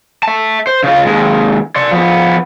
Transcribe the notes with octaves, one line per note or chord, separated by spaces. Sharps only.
E5 A5
C5
C#3 F4
D#2 G#3
D5 C6
F3 B3